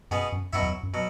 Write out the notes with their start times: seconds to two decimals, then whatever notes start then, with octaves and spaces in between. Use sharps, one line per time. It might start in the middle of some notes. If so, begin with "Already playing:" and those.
0.11 F#2 B2 B3 G#4
0.32 F#2
0.53 F#2 B2 F#3 E4 C#5 E5
0.62 E2
0.83 F#2
0.94 B2 F#3